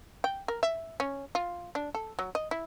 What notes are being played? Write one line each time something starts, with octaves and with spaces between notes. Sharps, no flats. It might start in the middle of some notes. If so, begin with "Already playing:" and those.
G5
A#4
E5
C#4
F4
D4
A4
F#3
D#5
E4